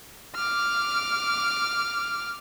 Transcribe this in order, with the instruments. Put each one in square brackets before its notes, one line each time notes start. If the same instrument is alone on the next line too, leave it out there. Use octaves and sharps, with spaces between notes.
[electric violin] D6 F6